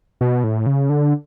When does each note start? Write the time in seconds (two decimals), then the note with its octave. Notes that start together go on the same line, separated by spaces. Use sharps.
0.21 B2
0.44 A2
0.66 C#3
0.89 D3